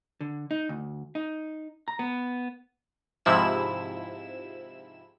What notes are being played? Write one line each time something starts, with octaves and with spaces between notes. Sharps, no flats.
D3
D#4
D2
D#4
A#5
B3
G#2 C3 F3 E4 E6 E7